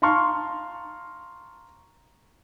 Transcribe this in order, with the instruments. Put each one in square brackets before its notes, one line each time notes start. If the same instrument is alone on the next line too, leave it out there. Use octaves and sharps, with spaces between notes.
[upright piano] F5 A5 A#5 C6 C#6 F6